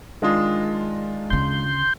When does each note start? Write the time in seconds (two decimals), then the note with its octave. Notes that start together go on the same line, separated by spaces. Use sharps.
0.22 D#3 G#3 D4 F4
1.30 D2 C#3 C6 G6